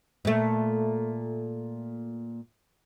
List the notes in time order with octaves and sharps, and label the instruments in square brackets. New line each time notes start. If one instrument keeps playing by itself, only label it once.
[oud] A#2 A3